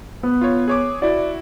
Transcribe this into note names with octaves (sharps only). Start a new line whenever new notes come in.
B3
F4 C#5
G#4 C#5 D6
E4 F#4 D5